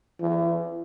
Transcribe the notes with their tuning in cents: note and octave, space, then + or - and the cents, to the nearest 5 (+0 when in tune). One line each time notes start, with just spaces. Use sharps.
E3 +35